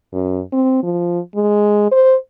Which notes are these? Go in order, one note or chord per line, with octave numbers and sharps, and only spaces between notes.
F#2
C4
F3
G#3
C5